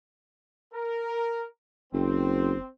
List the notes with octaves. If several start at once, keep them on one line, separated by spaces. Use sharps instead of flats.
A#4
F#1 C4